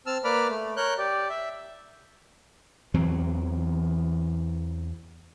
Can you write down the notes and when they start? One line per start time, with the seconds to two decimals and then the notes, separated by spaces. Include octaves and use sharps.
0.06 C4 A5 E6 F6
0.24 A#3 B4 D5 B5 D6 F6
0.48 A3
0.77 A#4 C#5 F#6 G6
0.98 G4 D5
1.29 E5
2.94 E2 E3 F#3 C4